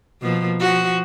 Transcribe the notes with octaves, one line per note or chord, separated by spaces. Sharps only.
B2 F3 A#3
F3 F#4